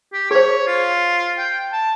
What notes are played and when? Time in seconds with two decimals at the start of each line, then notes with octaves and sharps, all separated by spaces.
0.13 G4
0.31 G#4 C5 C#5
0.67 F4
1.38 G5
1.72 A5